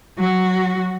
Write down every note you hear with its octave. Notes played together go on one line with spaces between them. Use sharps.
F#3 F#4